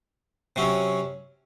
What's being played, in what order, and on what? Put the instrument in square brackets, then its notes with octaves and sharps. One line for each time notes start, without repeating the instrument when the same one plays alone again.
[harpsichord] C3 F#3 C#4